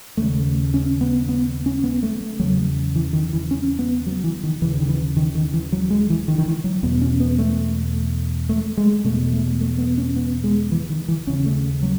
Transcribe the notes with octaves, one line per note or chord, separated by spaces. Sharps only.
D#2 C#3 A3
C#4
B3
B3
C#4
B3
A3
A3
E2 C#3 F#3
E3
D#3
E3
C#4
B3
F#3
E3
D#3
D#2 C#3 E3
D#3
E3
D#3
D#3
E3
F#3
G#3
E3
D#3
D#3
E3
F#3
E2 B2 B3
C#4
B3
A3
A3
G#3
E2 B2 A3
A3
A3
B3
C#4
B3
G#3
E3
D#3
E3
D#2 C#3 C#4
A3
F#3